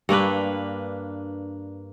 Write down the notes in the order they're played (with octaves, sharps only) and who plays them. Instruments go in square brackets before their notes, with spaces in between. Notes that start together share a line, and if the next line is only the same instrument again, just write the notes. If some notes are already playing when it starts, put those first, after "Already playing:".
[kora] G2 A#3 D4 B4